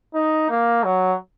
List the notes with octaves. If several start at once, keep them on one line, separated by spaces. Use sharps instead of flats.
D#4
A#3
F#3